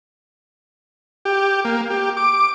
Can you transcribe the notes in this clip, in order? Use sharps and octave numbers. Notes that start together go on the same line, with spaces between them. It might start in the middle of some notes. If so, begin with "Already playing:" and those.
G4
A#3
G4
D6